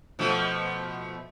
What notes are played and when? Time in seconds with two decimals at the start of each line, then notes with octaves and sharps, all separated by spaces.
0.19 B2 F3 A3